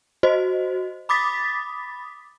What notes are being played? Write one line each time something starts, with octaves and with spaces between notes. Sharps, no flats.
F#4 C5 D#5
B5 D6 D#6 A6 B6